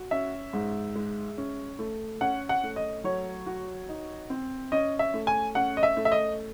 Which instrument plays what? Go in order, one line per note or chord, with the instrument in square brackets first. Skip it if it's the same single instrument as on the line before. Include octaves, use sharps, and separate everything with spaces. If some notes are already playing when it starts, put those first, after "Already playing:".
Already playing: [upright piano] F#4
[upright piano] C#4 [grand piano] E5
[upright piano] G#2
G#3
C#4
A3
[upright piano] C#4 [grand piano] F#5
[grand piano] F#5
[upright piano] A3
[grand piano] D#5
[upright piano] F#3 [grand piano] C#5
[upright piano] F#4
D#4
C4
[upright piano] C#4 [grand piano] D#5
[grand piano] E5
[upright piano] A3
[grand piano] G#5
[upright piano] C#4 [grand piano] F#5
[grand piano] D#5
E5
[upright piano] A3
[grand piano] E5
D#5